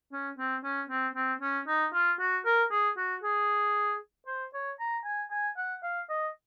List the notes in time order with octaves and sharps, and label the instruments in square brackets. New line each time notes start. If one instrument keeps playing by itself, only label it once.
[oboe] C#4
C4
C#4
C4
C4
C#4
D#4
F4
F#4
A#4
G#4
F#4
G#4
C5
C#5
A#5
G#5
G#5
F#5
F5
D#5